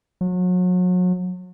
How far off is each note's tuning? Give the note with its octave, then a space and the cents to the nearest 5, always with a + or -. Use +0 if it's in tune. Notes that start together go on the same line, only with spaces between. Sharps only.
F#3 -35